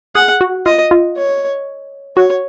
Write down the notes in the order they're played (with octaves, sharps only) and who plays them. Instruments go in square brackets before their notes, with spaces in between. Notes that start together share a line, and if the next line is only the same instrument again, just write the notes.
[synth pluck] G#4 [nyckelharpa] F#5
[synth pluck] F#4
[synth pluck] F4 [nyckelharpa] D#5
[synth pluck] F4
[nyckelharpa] C#5
[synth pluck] F#4 [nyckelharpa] C#5